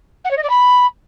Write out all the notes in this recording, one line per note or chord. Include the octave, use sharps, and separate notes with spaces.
F#5
C#5
D#5
D5
B5